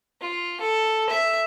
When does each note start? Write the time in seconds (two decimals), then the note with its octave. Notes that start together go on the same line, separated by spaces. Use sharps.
0.22 F4
0.61 A4
1.09 E5